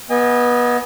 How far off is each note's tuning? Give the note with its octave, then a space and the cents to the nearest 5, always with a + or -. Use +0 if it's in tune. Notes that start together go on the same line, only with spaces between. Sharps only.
B3 -20 D#5 +25 G#5 -30